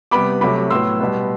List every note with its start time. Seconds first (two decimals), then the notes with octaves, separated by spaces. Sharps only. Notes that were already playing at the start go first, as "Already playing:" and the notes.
0.11 C3 G3 B3 B5 D6
0.41 C3 F#3 A3 B5 D6
0.70 A2 F#3 B3 C6 E6
1.00 B2 G3 B3